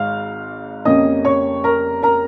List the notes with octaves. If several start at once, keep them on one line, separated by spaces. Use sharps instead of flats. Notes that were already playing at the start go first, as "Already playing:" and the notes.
Already playing: G#1 G#2 G#3 F5 F6
F1 F2 C#3 A#3 C#4 D#5 D#6
C#5 C#6
A#4 A#5
A#4 A#5